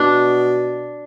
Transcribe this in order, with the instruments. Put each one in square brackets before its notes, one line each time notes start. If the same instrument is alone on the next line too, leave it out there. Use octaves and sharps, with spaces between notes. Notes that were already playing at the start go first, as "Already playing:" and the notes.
Already playing: [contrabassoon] B2 [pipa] D4